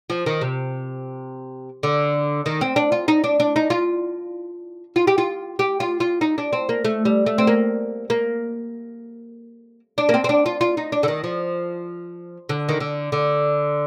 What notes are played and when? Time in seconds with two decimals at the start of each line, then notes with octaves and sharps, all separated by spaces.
0.10 F3
0.26 D#3
0.41 C3
1.83 D3
2.46 D#3
2.61 C4
2.76 D4
2.92 F4
3.08 D#4
3.24 D4
3.40 D4
3.56 D#4
3.70 F4
4.96 F4
5.07 G4
5.18 F4
5.59 G4
5.80 F4
6.00 F4
6.21 D#4
6.38 D4
6.53 C4
6.69 A#3
6.85 A3
7.05 G3
7.26 A3
7.38 C4
7.47 A#3
8.10 A#3
9.98 D4
10.09 A#3
10.14 C4
10.24 C4
10.29 D4
10.46 F4
10.61 F4
10.77 D#4
10.92 D4
11.03 D3
11.08 D#3
11.24 F3
12.49 D3
12.69 D#3
12.80 D3
13.12 D3